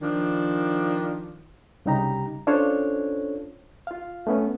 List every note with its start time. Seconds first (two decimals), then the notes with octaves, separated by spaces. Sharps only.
0.02 D#3 F3 D4
1.85 C2 C#3 G3 D#4 G4 A#5
2.47 C#4 D4 F4 A4 C5 C#5
3.87 F4 F5
4.27 A3 B3 C#4